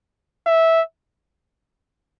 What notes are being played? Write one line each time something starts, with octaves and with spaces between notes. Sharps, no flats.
E5